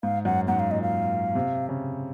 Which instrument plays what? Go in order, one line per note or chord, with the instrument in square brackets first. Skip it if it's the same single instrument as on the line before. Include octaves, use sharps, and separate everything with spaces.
[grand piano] G#2 [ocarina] F5
[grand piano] F#2 [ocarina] F#5
[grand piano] G#2 [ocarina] F#5
[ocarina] F5
[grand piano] A#2 [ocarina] D#5
[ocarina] F5
[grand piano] C3
C#3